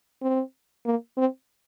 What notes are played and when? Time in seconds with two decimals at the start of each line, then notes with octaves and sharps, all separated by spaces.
0.22 C4
0.86 A#3
1.17 C4